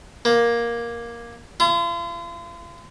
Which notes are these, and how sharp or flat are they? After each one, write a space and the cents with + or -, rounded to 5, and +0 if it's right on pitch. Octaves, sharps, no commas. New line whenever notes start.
A#3 +10
F4 -40